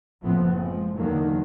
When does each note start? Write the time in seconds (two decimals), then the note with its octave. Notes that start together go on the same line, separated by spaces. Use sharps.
0.21 F#1 A2 F3 B3 C4
0.55 F3 G#3
0.96 E2 D3 D#3 F#3 A#3